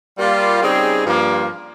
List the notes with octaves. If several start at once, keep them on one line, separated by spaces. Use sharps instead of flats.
G3 A#3 F4
C#3 G3 C4 D#4 G#4
G2 F3 A#3